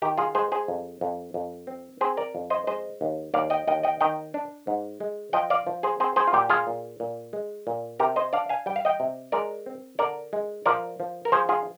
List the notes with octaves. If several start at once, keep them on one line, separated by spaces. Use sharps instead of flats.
D#3 G4
F4 G#4
G#3 G#4 C5
G#4 C5
F2
F2
F2
C4
C4 G#4 C5
A#4 D5
F2
C5 D#5
G#3 C5 D#5
D#2
D#2 D5 F5
D#5 G5
D#2 D#5 G5
D#5 G5
D#3 D#5 G5
D4
G#2
G#3
F3 D#5 G5
D5 F5
F3
G#4 C5
C4 G#4 C5
G#4 C5
F4
A#2 G4
F4 G#4
A#2
A#2
G#3
A#2
C3 G4 A#4
C5 D#5
D4 D5 F5
F5 G#5
G3 G5
F5
D#5 G5
C3
G#3 A#4 D5
C4
D3 A#4 D5
G#3
F3 A#4 D5
F3
A#4
F3 G#4 C5
F4 G#4